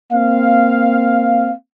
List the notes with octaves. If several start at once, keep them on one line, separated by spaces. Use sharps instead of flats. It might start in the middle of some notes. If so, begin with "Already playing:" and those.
A#3 C4 F5